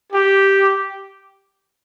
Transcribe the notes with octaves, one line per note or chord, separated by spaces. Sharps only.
G4